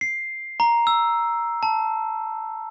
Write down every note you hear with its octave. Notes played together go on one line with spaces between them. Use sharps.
C7
A#5
E6
A5